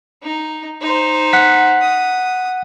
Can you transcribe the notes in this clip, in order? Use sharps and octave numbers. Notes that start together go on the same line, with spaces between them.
D#4
D#4 C5
F#5 B6
D#6